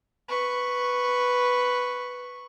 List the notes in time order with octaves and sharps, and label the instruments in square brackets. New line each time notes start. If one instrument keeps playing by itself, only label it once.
[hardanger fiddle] B4 C#6